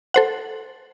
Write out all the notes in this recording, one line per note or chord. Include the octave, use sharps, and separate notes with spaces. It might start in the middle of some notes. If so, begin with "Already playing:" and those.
A4 C5 F#5